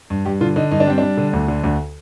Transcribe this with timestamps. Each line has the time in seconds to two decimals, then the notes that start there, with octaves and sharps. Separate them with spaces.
0.10 G2
0.25 G2 G4
0.41 D3 F4
0.56 D3 D#4
0.71 G2 D#4
0.80 D4
0.87 G3 C4
0.98 G3 D4
1.17 D3
1.33 D2
1.48 D3
1.64 D2